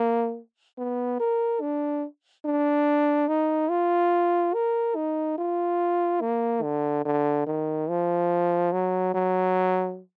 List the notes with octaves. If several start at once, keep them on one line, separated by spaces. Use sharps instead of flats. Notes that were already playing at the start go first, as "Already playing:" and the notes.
Already playing: A#3
B3
A#4
D4
D4
D#4
F4
A#4
D#4
F4
A#3
D3
D3
D#3
F3
F#3
F#3